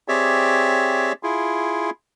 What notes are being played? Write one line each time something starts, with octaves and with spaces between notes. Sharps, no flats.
C4 G4 G#4 C#5 D5 E5
E4 F4 G#4